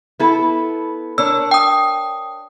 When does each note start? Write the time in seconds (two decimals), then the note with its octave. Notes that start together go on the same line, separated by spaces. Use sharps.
0.20 B3 E4 A4
1.18 D4 A#4 C#5 E6
1.51 G5 D#6